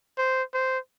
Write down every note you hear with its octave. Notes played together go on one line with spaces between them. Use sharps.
C5
C5